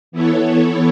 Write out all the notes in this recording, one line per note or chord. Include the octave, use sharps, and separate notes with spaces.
E3 B3 E4 A4 C#5